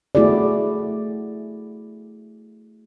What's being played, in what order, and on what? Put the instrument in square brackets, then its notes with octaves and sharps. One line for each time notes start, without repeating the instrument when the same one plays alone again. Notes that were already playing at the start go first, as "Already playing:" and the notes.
[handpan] A3 B3 E4 F#4 G#4 D5